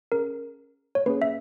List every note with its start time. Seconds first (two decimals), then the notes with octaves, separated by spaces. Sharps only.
0.12 C#4 G#4 A#4
0.95 C#5
1.06 A#3 C#4 G#4 B4
1.22 E5